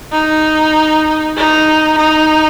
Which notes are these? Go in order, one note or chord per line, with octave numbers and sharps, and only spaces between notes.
D#4
D#4
D#4